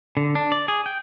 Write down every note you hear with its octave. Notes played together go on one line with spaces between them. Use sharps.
D3
D4
D5
G#4
G5